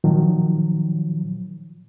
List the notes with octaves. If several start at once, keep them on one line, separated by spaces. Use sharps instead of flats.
A#2 D#3 F3 F#3